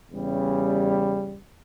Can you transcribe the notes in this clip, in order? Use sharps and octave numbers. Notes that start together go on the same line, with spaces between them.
E2 C#3 G3 C#4